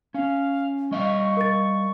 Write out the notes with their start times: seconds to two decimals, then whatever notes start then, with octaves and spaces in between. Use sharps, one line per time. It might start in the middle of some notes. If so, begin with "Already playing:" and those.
0.14 C#4 F5
0.91 G3 D#5 F5 C#6
1.37 A#4 A6